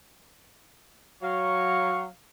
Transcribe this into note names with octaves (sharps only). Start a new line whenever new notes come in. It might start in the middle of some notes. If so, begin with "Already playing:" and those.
F#3 F5 C#6